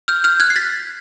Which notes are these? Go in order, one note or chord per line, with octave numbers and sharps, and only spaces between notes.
F6 G6
F6 G6
F#6 G#6
C7
A6 B6